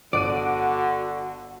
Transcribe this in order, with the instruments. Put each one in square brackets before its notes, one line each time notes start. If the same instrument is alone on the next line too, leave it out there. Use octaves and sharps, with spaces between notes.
[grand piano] G1 F#6 D#7 [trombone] D3 [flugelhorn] F#4 [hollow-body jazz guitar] D5